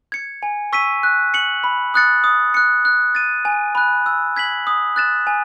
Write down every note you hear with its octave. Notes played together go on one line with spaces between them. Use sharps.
G#6 C#7
G#5
C#6 E6 B6 D#7
F#6
C#7 F#7
B5
D#6 F#6 A6 C#7
D#6
F#6 C#7
F#6
A6 D#7
G#5
B5 F#6
E6
G#6 B6 F#7
D#6
F#6 A6 E7
G#5